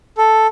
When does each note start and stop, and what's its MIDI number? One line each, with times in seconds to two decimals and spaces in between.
0.18 0.47 69